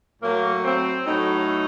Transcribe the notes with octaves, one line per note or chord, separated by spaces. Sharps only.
A2 F#3 A#3
C4
A2 F#3 D#4